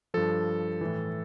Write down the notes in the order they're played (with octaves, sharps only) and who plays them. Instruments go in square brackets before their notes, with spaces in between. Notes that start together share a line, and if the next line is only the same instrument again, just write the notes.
[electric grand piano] G2 F3 A4
A2 E3